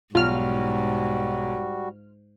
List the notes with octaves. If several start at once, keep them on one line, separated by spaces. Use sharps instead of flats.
B1 G#2 G3 F4 F#4 F6